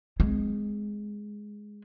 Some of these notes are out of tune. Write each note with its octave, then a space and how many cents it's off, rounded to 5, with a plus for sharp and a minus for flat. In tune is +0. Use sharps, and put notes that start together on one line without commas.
G#3 +0 C4 -30